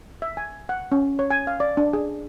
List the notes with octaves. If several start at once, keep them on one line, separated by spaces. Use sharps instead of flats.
E5
G#5
F#5
C#4
C#5
G#5
F5
D5
D4
G#4